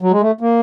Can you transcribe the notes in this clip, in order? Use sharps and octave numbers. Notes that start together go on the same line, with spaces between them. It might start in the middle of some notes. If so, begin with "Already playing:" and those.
F#3
G#3
A3
A#3